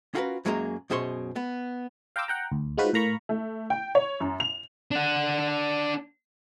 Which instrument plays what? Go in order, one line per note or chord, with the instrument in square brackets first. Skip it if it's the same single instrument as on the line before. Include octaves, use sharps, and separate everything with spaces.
[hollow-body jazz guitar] C#4 F4 F#4 G#4 A#4 B4
F#2 F#3 G#3 A#3 G#4 A#5
F#2 B2 G#4 C5 C#5 C6
B3
[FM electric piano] F5 G5 A#5 C6 D6 E6
F#5 G5 A#5
D2
G#3 D#4 F4 F#4 B4 C5
A2 A#4 F5 A#5 B5 C#6
[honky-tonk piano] A3
G5
C#5
F#2
F7
[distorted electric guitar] D4 F#5